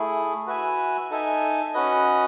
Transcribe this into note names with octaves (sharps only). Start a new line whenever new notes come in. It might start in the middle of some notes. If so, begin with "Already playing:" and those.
Already playing: A3 E4 G#4
F#4 B4 E5 G#5
D#4 A4 E5 G#5
C#4 F#4 B4 D#5